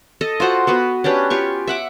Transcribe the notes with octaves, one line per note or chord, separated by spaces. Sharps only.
A4 D#5
F4 F#4 C5 F#5
B3 F#4 B4
C#4 D4 G4 B4
F4 G4 C#6
E5 F#5 D6